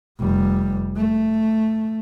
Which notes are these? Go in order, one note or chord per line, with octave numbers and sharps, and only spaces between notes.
F1 G3
A3